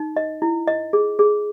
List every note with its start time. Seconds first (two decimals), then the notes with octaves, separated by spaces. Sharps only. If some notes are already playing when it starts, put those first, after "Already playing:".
Already playing: D#4
0.16 D#5
0.42 E4
0.68 D#5
0.93 G#4
1.19 G#4